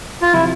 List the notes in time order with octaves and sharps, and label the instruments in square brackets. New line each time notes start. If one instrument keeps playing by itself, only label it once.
[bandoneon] F4
[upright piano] C3 F3 [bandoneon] E4